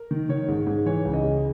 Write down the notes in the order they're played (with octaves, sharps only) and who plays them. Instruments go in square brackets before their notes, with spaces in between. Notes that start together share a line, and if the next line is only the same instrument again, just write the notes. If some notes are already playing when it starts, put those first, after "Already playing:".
Already playing: [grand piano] A#4
D#3
D#3 C#5
G#2
G#2
E3 C#5
C#2
D#5
C#3